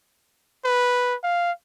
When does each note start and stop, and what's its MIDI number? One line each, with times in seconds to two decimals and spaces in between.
0.65 1.15 71
1.23 1.52 77